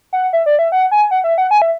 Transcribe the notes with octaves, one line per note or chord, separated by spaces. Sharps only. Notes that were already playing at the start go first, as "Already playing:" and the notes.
F#5
E5
D5
E5
F#5
G#5
F#5
E5
F#5
G#5
E5